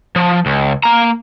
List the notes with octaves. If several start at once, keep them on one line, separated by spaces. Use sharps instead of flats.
F3
C#2
A#3 A#5